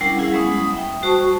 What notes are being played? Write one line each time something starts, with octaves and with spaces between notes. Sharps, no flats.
G3 C#4 D4 E4 A#4 F#5
G3 E4 G#4 F5 F#5
F#3 G#3 B3 C#4 D#6
F#3 F#5 D#6
E5 G5
G3 F#4 C5 A5 C#6 D#6